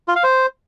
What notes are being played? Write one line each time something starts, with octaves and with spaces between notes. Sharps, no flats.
F4
F5
C5